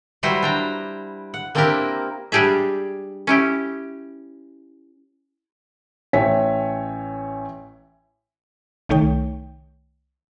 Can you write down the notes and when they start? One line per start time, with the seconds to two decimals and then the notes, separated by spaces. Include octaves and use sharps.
0.23 F#3 G3 E4 F#4 B4 C5
0.42 D4 G5 A#5
1.34 F#5
1.55 A#3 C4 D4 E4 G4 A#4
2.32 G3 D4 G4 G#4 E5
3.27 C#4 E4 G4
6.13 A1 C#5 E5 G5 G#5 B6
8.89 C2 D#3 A3 D#4 C#5 G5